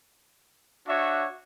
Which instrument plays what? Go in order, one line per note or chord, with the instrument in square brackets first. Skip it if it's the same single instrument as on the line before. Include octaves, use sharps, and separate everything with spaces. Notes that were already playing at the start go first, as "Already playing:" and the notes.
[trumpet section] D4 F#4 C#5 E5